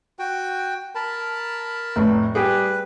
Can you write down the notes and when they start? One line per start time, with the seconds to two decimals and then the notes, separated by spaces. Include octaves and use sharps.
0.19 F#4 G5
0.95 A#4 A5 B5
1.96 F1 A2
2.35 G3 G4 G#4 B4